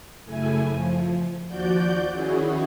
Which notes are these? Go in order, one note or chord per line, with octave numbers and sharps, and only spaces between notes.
F#2 C#3 A3 E4 G#5
F3
D#2 F3 F#4 D5 G6
D#3 C#4 E4 F#4 G#4